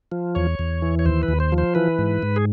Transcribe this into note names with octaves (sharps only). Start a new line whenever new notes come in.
F3
E2 C#5
E2
E3
C#5
D#2 C5
B4
D#2
C5
F3
C5
E3 B4
G#2
G#2
G#4